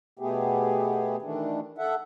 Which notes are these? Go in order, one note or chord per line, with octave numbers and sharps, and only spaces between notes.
B2 A3 B3 G4 G#4
D#3 E3 A3 D4
A4 E5 F#5